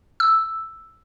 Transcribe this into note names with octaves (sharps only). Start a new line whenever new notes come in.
E6